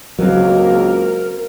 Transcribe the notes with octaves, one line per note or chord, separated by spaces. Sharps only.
C#2 F#3 A#3 C4 F#4 A#4